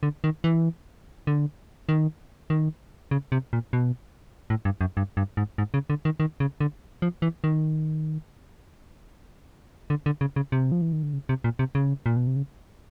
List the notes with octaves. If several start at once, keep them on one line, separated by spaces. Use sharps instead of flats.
D3
D#3
E3
D3
D#3
D#3
C#3
C3
A#2
B2
A2
G2
F#2
G2
G2
G#2
G#2
C#3
D3
D#3
D#3
C#3
D3
F3
E3
D#3
D3
D3
C#3
C#3
C3
F3
E3
D#3
D3
C#3
C3
A#2
C3
C#3
A#2
B2
C3
C#3